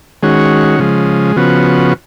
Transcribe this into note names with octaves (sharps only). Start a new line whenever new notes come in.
D#3 G#3 C#4 F#4
C#3 F3 G#3
C#3 F3 B3 F#4